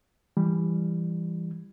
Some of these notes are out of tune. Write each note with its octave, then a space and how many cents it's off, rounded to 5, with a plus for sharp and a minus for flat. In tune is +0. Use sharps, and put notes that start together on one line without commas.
E3 +25 G3 +15